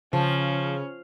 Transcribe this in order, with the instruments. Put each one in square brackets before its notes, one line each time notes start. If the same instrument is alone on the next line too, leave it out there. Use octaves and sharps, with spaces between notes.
[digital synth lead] C#3 [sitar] F3 [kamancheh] C#4